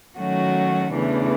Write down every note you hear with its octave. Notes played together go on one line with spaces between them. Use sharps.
D#3 F#3 A3 C#4 F#4
E2 C#3 E3 A3 D4